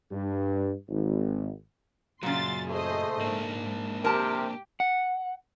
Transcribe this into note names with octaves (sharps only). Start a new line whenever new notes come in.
G2
G#1
F#2 A#2 C#3 F#3 C6 A6
A3 G#4 C5 D#5
G#2 A#3 D4
C3 G4 A#4 A5
F#5